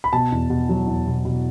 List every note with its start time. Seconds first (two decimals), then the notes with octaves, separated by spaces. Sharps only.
0.04 B5
0.13 B2 A5
0.32 E2
0.50 B2
0.69 F#3
0.87 E2
1.07 B2
1.25 B2